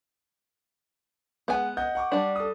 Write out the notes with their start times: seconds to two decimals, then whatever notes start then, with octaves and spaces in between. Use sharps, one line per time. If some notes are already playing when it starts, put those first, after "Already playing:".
1.48 G#3 B3 F#5 G#5
1.77 D#5 F#5 G6
1.95 F#5 C#6 D6
2.12 G3 D4
2.36 A4 D#6